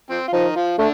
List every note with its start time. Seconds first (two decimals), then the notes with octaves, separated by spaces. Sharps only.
0.10 F3 C4
0.28 F4
0.33 D#3 F3 D#4
0.56 F3 F4
0.78 D3 A3 D4